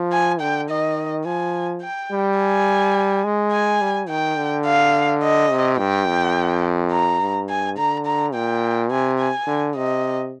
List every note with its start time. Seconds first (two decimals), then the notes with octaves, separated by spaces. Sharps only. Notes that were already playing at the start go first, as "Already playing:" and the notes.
Already playing: F3
0.12 G#5
0.40 D3 G5
0.69 D#3 D#5
1.25 F3 G#5
1.82 G5
2.11 G3
2.39 G#5
3.25 G#3
3.52 G#5
3.81 G3
4.09 D#3 G5
4.38 D3
4.66 F5
5.23 D#5
5.52 C3
5.79 G2 G5
6.07 F2
6.92 A#5
7.21 G2
7.49 G#5
7.78 D3 A#5
8.06 A#5
8.34 A#2 G5
8.91 C3 G#5
9.19 G#5
9.47 D3
9.76 C3 D#5